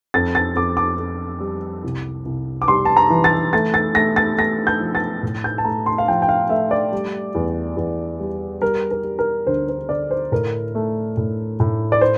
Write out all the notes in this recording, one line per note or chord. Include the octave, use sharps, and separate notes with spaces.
F2 A6
A6
F2 D6
D6
F2
G3
C2
C2
D6
G3 C6
A5
A#5
E3
A6
A3 A6
A6
A3 A#6
A6
A3 A#6
G6
F3
A6
A2
G6
A5
A3 A#5
C6
F5
F3 G5
G5
F5
A3 E5
D5
G3
E2
E2
G3
G3 A#4
A#4
G3
A#4
D2 C5
C5
D3 D5
C5
A2 A#4
A3
A2
A2
D5
C5